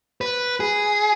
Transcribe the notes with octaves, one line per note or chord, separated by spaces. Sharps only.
B4
G#4